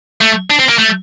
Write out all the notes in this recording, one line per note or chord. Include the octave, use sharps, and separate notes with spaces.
A3
D4
C4
A#3
A3